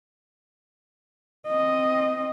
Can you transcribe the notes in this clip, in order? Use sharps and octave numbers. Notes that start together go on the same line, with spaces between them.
C4 D#5